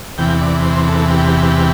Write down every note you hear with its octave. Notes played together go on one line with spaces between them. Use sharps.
E2 C3 E3 G5
D5
C5
A4
G4